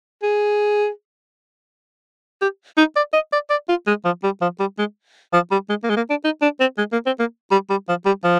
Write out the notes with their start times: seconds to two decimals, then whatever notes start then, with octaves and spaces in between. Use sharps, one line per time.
0.23 G#4
2.42 G4
2.78 D#4
2.96 D5
3.13 D#5
3.33 D5
3.50 D5
3.69 F4
3.87 G#3
4.05 F3
4.24 G3
4.42 F3
4.60 G3
4.79 G#3
5.33 F3
5.52 G3
5.69 G#3
5.84 A#3
5.90 G#3
5.97 A#3
6.10 D4
6.24 D#4
6.42 D4
6.60 C4
6.78 G#3
6.92 A#3
7.06 C4
7.19 A#3
7.51 G3
7.70 G3
7.89 F3
8.06 G3
8.24 F3